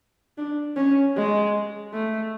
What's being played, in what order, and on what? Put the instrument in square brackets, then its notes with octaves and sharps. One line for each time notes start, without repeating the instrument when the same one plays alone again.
[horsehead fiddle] D4
C#4
G#3
A3